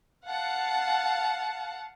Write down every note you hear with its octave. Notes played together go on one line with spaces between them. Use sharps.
F5 F#5 A5